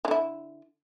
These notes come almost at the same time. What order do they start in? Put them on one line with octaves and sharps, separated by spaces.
E3 D3 E4